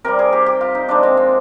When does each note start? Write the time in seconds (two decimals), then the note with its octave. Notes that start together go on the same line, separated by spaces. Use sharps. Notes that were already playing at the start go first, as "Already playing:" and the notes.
0.04 C3 G3 A#4
0.19 G#4
0.32 G4
0.46 G4
0.61 F4
0.75 D#4
0.89 C3 F3 G#3 D4
1.03 C4
1.17 C4